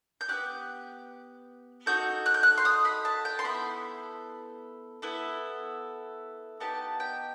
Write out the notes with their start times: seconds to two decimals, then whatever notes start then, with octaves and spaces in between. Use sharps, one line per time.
0.21 G6
0.28 B3 E4 G4 F#6
1.86 D#4 F#4 A4 G6
2.26 F#6
2.34 G6
2.43 F#6
2.58 C6
2.65 D#6
2.85 B5
3.05 A5
3.25 G5
3.39 C6
3.44 B3 E4 A4 B5
5.02 B3 E4 A4
6.60 B3 D#4 G4 A5
7.00 G5